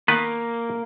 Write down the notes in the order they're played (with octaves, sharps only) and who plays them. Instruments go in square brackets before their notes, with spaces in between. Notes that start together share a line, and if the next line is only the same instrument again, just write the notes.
[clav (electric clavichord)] D#3 B3 B4 [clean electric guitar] A#3